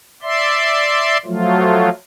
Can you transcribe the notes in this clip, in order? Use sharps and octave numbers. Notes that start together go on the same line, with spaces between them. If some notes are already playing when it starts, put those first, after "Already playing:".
D5 E5 C6
F3 F#3 A3 F4